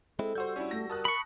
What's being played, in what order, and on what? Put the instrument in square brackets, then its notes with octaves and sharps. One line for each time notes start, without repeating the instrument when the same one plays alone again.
[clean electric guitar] G#3 C4 E4 [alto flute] A4
[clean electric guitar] G3 F#4 [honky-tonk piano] C5 E6 G6
[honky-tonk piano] C#4 D4 E4
[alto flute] A3 [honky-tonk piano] A#6
[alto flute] A#4 [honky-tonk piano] A5 D#6 F#6
[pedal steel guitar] B5 C#6